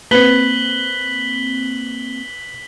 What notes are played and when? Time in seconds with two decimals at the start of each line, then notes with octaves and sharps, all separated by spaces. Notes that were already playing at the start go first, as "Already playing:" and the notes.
0.11 A#3 C4 B4 B6 F#7 G7